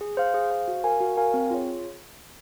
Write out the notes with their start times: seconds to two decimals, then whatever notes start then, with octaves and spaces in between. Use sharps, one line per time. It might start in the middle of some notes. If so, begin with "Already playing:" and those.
0.01 G#4
0.17 C5 F5
0.34 G#4
0.50 C5 F5
0.68 F#4
0.84 A#4 F5 G#5
1.00 F#4
1.17 A#4 F5 G#5
1.34 C4
1.51 F4 G#4 C#5